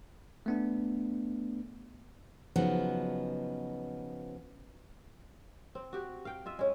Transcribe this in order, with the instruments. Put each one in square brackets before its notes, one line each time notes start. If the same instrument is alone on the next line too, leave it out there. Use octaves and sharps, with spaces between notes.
[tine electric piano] A3 B3 D4
[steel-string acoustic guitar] C#3 F3 F#3 B3 D#4
[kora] C4
F#4 G4
F5 G5
F4 D#5 E5
G#3 C#4